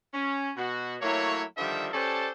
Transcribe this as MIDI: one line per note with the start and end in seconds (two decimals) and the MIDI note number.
0.13 0.50 61
0.57 0.96 47
0.57 0.96 66
1.01 1.43 54
1.01 1.43 57
1.01 1.43 58
1.01 1.43 64
1.01 1.43 73
1.57 1.88 50
1.57 1.88 51
1.57 1.88 53
1.57 1.88 55
1.57 1.88 76
1.93 2.29 61
1.93 2.29 67
1.93 2.29 69
1.93 2.29 72
1.93 2.29 74
1.93 2.29 81